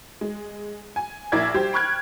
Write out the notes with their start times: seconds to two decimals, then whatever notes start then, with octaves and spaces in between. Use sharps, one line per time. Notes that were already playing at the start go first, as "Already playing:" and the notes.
0.21 G#3
0.96 G#5
1.32 A#1 E4 A#4 D5 E5 G#6
1.54 G3 G4 C5
1.73 G5 B5 C#6 F6 F#6 G#6